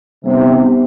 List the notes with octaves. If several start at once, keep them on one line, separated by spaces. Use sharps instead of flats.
C3 G3 B3 D#4